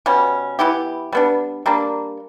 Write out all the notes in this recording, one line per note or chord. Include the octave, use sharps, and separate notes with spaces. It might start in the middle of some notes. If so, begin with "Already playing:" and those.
B2 G3 C#4
E3 B3 E4 G4
G3 B3 D4
G3 A#3 D4